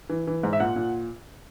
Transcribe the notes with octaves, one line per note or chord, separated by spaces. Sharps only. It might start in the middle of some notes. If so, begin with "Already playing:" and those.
E3
E3
G#2
E5
A#2 F#5
A#2